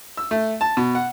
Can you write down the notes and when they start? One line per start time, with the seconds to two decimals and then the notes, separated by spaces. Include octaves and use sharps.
0.17 E6
0.31 A3
0.61 A5
0.77 B2
0.95 F#5